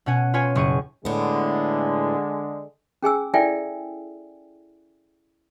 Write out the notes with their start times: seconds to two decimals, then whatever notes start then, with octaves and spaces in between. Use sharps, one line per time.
0.06 B2 C#4 F#5 G#5
0.34 F4 B4 C#5 G#5
0.55 F#1 C#6 D#7
1.05 A2 D3 G#3 B3
3.02 C#4 G#4 G#5 E6
3.34 E4 A4 D5 E5 G5 G#5